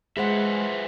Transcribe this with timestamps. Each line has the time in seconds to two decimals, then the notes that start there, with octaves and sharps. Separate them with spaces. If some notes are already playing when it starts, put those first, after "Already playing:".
0.17 G#3 F4 G#4 B4 C5 E5 F#5